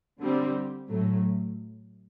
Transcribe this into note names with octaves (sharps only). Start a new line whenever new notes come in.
D3 G3 C4
A2 F#3 A3